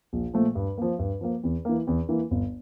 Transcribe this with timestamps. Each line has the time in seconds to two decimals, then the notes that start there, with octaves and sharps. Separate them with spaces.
0.13 A#1
0.34 A#2 F3 A3
0.55 G2
0.78 F3 A#3
0.99 G2
1.21 F3 A#3
1.43 E2
1.65 E3 A#3
1.87 E2
2.09 E3 A#3
2.31 G1